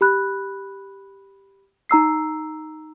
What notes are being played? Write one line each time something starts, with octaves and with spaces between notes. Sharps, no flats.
G4 B5 F#6
D#4 A#5 E6 C7